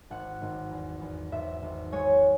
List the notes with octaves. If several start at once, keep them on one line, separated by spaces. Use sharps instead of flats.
G#1 F#5
G#1
E2
E2
G#1 E5
G#1
G#3 C#5